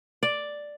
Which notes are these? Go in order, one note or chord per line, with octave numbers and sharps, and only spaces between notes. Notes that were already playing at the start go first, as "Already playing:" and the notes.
D5